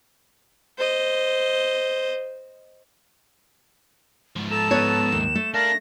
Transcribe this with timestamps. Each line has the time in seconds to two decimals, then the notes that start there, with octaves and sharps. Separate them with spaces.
0.78 C5 D#5
4.36 G#2 F3
4.51 A4 A5 A#5 E7
4.71 B3 B4 C#5
5.12 D#2
5.35 A3
5.54 D4 A#4 F5 A5 A#6